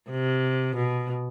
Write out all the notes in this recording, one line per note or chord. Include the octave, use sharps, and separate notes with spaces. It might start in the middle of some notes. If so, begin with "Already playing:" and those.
C3
B2